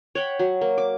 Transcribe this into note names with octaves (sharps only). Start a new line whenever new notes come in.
C#5 F#5 G5 B5
F#3
A#3
D6